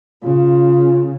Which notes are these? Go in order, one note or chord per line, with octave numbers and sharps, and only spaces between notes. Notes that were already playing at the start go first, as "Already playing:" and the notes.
C#3 F4